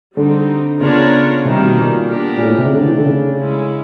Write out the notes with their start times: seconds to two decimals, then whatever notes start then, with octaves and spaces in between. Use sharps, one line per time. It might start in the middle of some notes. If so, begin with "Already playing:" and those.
0.16 D3 G3 C4 D#4
0.81 C#3 B3 D4 F4 A#4 C#5
1.45 C3 D#3 G3 A#3
1.62 B2
1.78 A#2
2.10 B3 D4 G4 A#4
2.37 A#2
2.43 A2
2.50 A#2
2.58 C3
2.66 C#3
2.74 D3 A3 D4 G4
2.82 E3
2.90 D#3
2.98 D3
3.06 C#3
3.38 G#3 C#4 E4